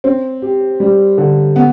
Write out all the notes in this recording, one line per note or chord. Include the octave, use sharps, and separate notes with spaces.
C4
G4
G3
D3
B3